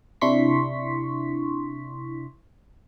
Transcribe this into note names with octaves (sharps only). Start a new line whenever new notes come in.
C3 D4 E4 C6 C#6 B6